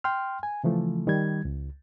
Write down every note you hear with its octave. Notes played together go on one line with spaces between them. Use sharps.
G5 C6 F6
G#5
C#3 E3 F3 A3
D#3 G3 G#6
C#2